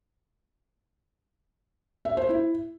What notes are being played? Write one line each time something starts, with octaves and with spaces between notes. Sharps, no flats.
E5
C5
E4